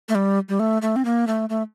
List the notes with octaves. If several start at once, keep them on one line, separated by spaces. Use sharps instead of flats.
A3
G3
G3
A3
A3
C4
A#3
A3
A3